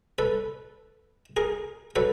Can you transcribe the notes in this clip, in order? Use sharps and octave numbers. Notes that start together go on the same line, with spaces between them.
A4 B4
G#4 A#4
F#3 A4 B4